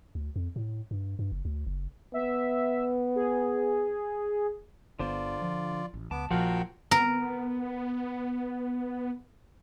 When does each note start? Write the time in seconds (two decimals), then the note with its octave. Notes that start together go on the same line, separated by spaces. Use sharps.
0.15 D2
0.36 F2
0.56 A2
0.91 G2
1.19 G2
1.32 F#1
1.45 D2
1.67 F#1
2.14 B3 E5
3.16 G#4
4.99 G1 D3 B3 F4 C5 D5
5.42 F3
5.94 A1
6.11 C#2 B3 A5 D6
6.31 A#1 A#2 F3 F#4 A#4 F5 G5
6.91 B3 A#4